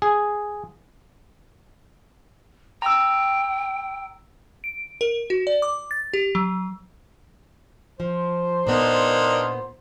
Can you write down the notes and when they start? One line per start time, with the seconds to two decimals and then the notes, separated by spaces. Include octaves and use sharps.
0.02 G#4
2.82 G5 A#5 E6
4.64 D7
5.01 A#4
5.30 F#4
5.47 D5
5.62 D6
5.91 A6
6.13 G4
6.35 F#3
8.00 F3 C5
8.67 A#2 A#3 B3 D4 D#4